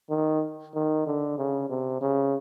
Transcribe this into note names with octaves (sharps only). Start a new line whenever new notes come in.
D#3
D#3
D3
C#3
C3
C#3